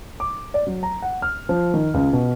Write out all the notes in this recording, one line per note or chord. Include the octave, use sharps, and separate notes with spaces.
D6
D5
F#3
A#5
F#5
F6
F3
D#3
C#2
B2